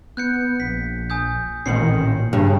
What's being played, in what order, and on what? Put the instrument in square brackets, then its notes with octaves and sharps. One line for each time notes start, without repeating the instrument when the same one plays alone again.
[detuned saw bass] B3 [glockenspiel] F#6 G6 C#7
[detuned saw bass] A#1 [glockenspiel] B6
[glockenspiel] G#5 D#6 G6
[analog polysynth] A1 D#3 [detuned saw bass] A#2 [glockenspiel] C7 C#7 F#7
[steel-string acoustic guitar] G2 [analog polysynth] C#3